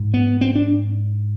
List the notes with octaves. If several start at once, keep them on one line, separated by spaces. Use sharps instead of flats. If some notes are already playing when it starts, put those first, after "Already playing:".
Already playing: G#2
B3
C4
D4